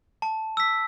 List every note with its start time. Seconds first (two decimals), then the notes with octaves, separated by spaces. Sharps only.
0.22 A5
0.57 E6 B6